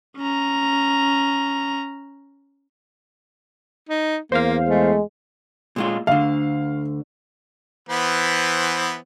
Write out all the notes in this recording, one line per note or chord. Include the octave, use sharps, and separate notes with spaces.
C#4 A#5
D#4
E2 A#3 C5 F5
G#3 A3
A#2 G#3 F4
D2 D3 F5
E3 B3 C5